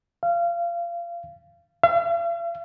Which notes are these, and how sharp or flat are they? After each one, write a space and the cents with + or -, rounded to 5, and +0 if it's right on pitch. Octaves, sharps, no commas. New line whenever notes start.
F5 -25
F5 -45